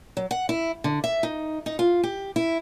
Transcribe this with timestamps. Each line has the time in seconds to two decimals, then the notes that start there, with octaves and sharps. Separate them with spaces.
0.17 F#3
0.31 F#5
0.49 E4
0.84 D3
1.04 E5
1.23 D#4
1.66 D#4
1.79 F4
2.03 G4
2.36 E4